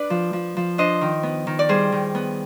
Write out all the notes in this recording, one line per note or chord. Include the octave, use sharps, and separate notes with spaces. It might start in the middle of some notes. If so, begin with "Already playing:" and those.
Already playing: D4 B4 D5
F3
F3
F3
D4 C5 D#5
D#3
B3
D#3
D5
G3 G#4 C5
D#3
B3